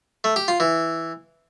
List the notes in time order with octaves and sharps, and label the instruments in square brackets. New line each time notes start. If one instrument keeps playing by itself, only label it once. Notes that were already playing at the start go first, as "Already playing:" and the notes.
[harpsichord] A3
G4
F4
E3